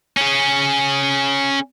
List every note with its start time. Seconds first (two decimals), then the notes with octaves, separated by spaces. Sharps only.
0.17 C#4 G#4